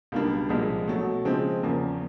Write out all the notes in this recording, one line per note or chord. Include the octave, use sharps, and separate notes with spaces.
C#2 B2 G3 A#3 D4
C2 A#2 F3 G#3
B2 F#3 A3
C#3 F3 G#3 C4
E2 C#3 F3 A#3